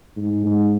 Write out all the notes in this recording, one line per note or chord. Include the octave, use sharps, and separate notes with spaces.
G#2
G#2